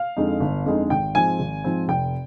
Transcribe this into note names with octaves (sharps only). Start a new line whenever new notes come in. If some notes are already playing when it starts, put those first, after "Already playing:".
Already playing: F5
F2 D3 G#3 D#4
G1
F2 D3 G#3 D#4
G#1 G5
G#2 F3 C4 G#5
G#1
G#2 F3 C4
F1 G5